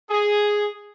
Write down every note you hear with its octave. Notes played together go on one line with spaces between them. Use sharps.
G#4